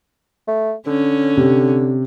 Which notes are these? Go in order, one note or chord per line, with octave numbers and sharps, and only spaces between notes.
A3
D3 C#4
C3